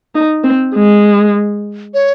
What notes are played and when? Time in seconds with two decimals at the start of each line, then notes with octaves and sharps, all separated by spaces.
0.15 D#4
0.44 C4
0.75 G#3
1.94 C#5